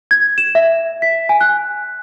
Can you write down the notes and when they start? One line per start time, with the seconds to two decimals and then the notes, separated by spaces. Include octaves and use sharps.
0.11 G#6
0.38 E7
0.55 E5
1.02 B6
1.29 G#5
1.41 F#6